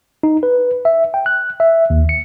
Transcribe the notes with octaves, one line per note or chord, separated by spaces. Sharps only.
D#4
B4
E5
G5
F#6
E5
D#2
C#7